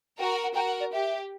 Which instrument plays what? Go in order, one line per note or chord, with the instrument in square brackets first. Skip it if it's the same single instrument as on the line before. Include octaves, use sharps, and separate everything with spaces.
[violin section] F#4 A#4 [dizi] G5
[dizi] F#5
F#5
[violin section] F#4 A#4 [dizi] G5
[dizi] F#5
D5
[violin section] G4 [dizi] E5